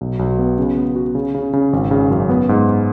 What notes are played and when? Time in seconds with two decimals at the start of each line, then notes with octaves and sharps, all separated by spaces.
0.01 B1
0.19 B1
0.39 B3
0.58 C#3
0.77 B3
0.96 F#4
1.15 C#3
1.35 C#3
1.53 C#3
1.73 G#1
1.91 C#3
2.11 F#2
2.29 B3
2.49 G#2